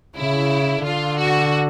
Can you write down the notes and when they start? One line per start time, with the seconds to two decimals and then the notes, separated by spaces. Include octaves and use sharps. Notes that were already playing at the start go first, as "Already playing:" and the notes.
0.17 C#3 E4
0.84 D3 F4
1.18 F#4